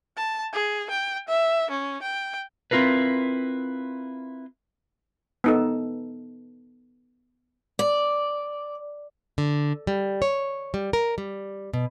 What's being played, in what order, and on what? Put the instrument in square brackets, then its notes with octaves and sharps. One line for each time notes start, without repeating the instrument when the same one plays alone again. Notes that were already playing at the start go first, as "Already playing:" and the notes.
[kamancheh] A5
G#4
G5
E5
C#4
G5
[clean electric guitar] C4 E4 F4 A#4 B4
[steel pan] B3 D#4 A4
[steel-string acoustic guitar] D5
[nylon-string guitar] D3
G3
C#5
G3
A#4
G3
B2